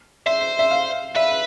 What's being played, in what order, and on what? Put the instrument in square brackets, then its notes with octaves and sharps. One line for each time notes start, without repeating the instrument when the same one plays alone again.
[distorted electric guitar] C5 [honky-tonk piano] E5
[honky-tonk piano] E5
F5
[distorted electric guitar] B4 [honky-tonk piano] E5